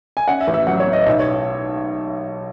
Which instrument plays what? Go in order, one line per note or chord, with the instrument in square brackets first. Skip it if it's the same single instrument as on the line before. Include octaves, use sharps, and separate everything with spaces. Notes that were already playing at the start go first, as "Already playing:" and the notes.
[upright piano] G#5
C#4 F#5
E5
A1
E5
F#3 F#5
C#5
A2
D#5
B1 E5
C#5